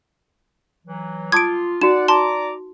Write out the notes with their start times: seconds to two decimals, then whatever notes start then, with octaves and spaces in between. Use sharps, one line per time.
0.86 E3 F#3
1.32 F4 A5 D6 D#6 G#6 D7
1.81 D#4 F#4 D5 F#5 E7
2.08 D5 A5 A#5 C6 D6